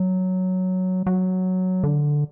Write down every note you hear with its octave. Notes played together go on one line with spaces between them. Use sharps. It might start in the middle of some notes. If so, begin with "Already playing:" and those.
Already playing: F#3
F#3
D3